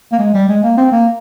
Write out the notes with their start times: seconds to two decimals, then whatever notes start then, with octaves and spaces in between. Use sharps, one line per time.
0.12 A#3
0.19 G#3
0.34 G3
0.49 G#3
0.63 A#3
0.77 C4
0.92 A#3